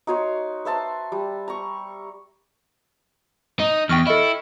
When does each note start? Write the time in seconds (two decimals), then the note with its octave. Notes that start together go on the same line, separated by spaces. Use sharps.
0.07 D#4 F#4 C#5 C6
0.65 B4 E5 A5 C6
1.12 G3
1.48 A#5 C#6
3.60 D#4
3.89 E2 G5 C#6 F6
4.07 E4 A4 D#5